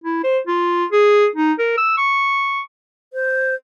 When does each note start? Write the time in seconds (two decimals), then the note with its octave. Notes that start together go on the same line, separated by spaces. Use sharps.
0.04 E4
0.24 C5
0.47 F4
0.92 G#4
1.36 D#4
1.59 A#4
1.78 E6
1.98 C#6
3.13 C5